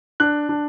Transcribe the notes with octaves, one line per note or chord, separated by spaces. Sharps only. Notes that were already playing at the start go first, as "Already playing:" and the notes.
D4 F#6
D4